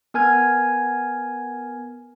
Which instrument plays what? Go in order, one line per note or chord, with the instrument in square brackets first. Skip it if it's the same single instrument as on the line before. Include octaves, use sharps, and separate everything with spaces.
[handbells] B3 A#4 G#5 F6 G#6